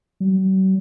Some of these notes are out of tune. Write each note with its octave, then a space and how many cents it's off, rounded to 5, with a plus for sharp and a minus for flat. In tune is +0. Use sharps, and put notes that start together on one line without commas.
F#3 +45